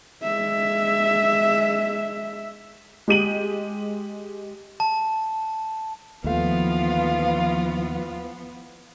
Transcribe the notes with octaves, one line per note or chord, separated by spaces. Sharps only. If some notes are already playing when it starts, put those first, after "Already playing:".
G#3 E5
G#3 G4 D#7 F#7
A5
D#2 E3 F3 A3 B3 F4 F5